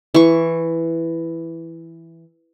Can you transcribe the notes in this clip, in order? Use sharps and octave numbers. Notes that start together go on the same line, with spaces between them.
E3 C#6